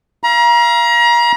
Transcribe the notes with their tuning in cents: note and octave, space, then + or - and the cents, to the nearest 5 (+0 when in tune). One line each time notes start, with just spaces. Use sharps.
F5 -30 A#5 +35